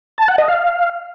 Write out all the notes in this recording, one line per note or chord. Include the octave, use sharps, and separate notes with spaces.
A5
F#5
D#5
F5